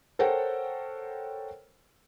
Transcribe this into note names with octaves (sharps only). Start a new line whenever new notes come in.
A4 A#4 C5 C#5 F#5 G5